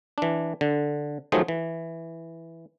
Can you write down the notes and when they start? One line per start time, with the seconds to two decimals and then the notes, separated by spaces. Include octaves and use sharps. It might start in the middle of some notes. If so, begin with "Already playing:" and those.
0.18 E3 D4
0.61 D3
1.32 D#3 F3 F#3 A3 G#4 C5
1.48 E3